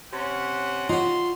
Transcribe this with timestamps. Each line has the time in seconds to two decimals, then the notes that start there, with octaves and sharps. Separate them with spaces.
0.12 C3 C#4 F#5
0.89 D#4 F4 F#4 C#5 C6